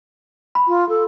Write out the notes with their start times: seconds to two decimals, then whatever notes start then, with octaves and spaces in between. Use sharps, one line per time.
0.55 B5
0.68 F4
0.89 A4